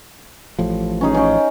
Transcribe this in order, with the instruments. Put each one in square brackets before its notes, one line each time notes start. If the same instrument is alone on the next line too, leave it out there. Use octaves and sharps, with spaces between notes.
[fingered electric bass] A1 A2 F3
[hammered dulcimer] C#4 D#4 G#4
C#4 G5